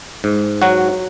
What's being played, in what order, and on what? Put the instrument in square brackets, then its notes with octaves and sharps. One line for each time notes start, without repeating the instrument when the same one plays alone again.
[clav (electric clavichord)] G#2
F#3 F#4